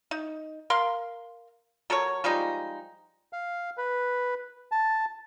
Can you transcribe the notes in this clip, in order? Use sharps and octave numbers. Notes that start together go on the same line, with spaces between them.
D#4
A#4 F5 C6
F#3 A4 A#4 C#5
F3 G3 G#3 D#4
F5
B4
A5